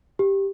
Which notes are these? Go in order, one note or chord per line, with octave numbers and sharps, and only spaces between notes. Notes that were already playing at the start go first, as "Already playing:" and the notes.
G4